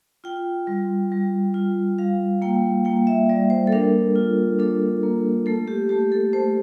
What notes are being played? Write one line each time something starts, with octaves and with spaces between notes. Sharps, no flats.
F4 G5
G3
G3
F4
G3 F5
A#3 G5
A#3 G5
E5
G3 D5
C5
A4
D4 A#4
F4
D4 A4
A#3
A3 A4
G4
A3 G4
A4
A3 C5